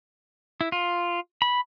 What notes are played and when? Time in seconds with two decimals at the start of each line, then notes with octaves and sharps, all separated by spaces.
0.61 E4
0.72 F4
1.42 B5